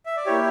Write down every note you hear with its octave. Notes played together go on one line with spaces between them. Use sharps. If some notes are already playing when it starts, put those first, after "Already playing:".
E5
D5
A#3 E4 G4 C#5